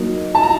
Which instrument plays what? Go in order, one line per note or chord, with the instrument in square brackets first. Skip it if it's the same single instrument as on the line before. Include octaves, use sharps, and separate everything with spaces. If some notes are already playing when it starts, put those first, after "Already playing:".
Already playing: [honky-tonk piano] F#3 A#3 D#4
A5
A#5